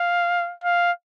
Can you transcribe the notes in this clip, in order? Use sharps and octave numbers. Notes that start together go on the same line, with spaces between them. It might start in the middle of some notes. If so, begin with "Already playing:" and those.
Already playing: F5
F5